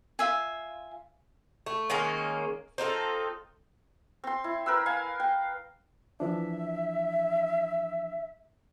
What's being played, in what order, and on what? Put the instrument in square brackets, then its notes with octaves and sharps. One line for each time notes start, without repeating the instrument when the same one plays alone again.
[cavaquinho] F4 E5 G#5
[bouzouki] A3
D#3 G#3 A#3 C#4
C4 D#4 F4 A4
[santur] C4 C6
E4
A#4 B4 E6
F5 G#5
G5
[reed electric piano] E3 F3 D4 [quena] E5